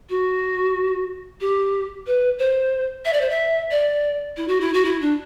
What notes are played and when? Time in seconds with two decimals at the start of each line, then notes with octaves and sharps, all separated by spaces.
0.09 F#4
1.41 G4
2.07 B4
2.39 C5
3.05 E5
3.13 D5
3.21 C5
3.30 E5
3.71 D5
4.37 E4
4.48 F#4
4.60 E4
4.73 F#4
4.85 E4
5.01 D4